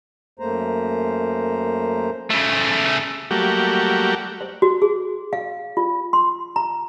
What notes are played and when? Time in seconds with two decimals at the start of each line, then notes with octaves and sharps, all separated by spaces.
0.39 F#2 A3 A#3 C5 A#5
2.30 C#3 A3
3.31 F#3 G3 A3 A#3 F#4 G4
4.41 C5
4.62 F#4
4.82 G#4
5.33 F5
5.77 F4
6.13 C6
6.56 A#5